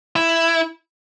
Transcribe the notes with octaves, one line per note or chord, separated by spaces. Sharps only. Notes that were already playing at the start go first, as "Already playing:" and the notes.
E4